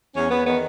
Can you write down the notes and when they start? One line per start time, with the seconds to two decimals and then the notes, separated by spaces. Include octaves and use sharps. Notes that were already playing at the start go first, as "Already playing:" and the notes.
0.14 E2 C#4
0.30 E2 B3
0.45 D#3 B3